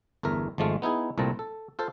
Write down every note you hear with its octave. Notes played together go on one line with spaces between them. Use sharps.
G1 E2 A3 A#4 E5
G#1 F3 G#3 A3 F5
B3 D#4 E4 G#4
C2 A#2 A3 C4 A5 A#5
A4
F4 A4 C5